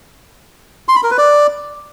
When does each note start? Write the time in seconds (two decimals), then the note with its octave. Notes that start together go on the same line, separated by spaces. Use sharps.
0.88 C6
0.96 B5
1.03 A#4
1.11 B4
1.18 D5